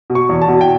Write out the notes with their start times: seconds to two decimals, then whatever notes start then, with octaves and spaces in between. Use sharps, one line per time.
0.10 B2
0.15 C#6
0.29 E2
0.42 A5
0.48 B2
0.61 G5